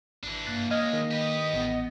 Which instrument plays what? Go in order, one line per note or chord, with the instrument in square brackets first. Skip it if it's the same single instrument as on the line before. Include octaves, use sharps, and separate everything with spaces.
[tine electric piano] G#1 [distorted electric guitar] E3 D4
[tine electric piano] G2 F#6 A6 [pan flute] A#3
[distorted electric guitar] G#3 C#4 [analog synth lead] D#5 [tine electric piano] F6 G#6
[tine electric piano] D#3
[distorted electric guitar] G4 B4
[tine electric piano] A1 [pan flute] B3